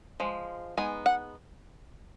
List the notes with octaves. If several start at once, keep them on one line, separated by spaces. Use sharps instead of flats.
F3 G#3
G#3 B3 D#4 G#5
F#5